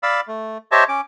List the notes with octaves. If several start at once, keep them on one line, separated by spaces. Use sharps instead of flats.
D5 F5 B5 E6
A3
G4 C5 C#5 D#5 E5 A5
C#4 D6